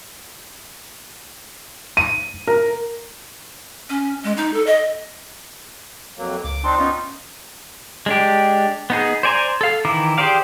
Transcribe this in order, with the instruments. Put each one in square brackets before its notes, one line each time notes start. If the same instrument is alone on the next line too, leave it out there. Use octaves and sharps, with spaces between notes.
[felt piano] D#7
A#4
[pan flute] C#4
G#3
D#4
A4
D#5
[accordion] F2 F#3 A#3
[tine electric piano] C#2 [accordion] D6
[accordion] C4 D4 D#4 [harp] C6
[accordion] B3 D#4 F4 [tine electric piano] C#4 G5 C#6
[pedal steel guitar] G#3 D4 G4
B3 D#4 G#4
C5 D5 G#5 A#5
A4 F5
D#3 E3 E4 A#5 D6
G4 G#4 C5 D5 F5